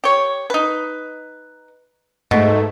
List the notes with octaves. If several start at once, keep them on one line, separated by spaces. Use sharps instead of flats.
G4 C#5
D#4 B4
G#2 B2 A3